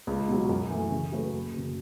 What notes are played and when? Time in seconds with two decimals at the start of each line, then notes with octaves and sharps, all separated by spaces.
0.07 C#2
0.28 B2 F#3
0.49 F#2
0.70 E3 A3
0.91 C#3
1.12 F#3 A3 F#4 B4
1.33 F#1
1.54 F#2 C#3